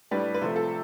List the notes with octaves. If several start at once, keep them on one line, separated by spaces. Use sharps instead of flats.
A2 G3 D4 B4
B4
C3 F3 A3 C5
A4